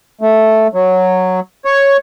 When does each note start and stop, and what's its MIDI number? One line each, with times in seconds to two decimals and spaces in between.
0.21 0.67 57
0.74 1.40 54
1.65 1.97 73